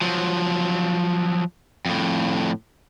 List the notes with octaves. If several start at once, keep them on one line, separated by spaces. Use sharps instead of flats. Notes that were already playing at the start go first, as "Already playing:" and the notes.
F3 F#3
F2 A2